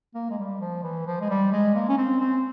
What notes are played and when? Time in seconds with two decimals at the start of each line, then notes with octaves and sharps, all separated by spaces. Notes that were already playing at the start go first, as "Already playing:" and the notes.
0.15 A#3
0.31 G#3
0.38 G3
0.60 F3
0.83 E3
1.06 F3
1.21 G#3
1.29 G3
1.52 G#3
1.75 A#3
1.89 C#4
1.98 C4
2.21 C4